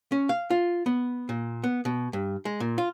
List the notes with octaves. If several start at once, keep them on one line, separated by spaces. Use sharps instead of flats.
C#4
F5
F4
B3
A#2
B3
B2
G2
G#3
A#2
F4